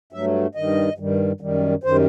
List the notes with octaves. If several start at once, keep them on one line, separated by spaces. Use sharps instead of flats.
G2 F#3 A3 E5
G2 D#3 G3 D#5
G2 D#3 G3
F#2 D#3 G3
F#2 D#3 G3 C5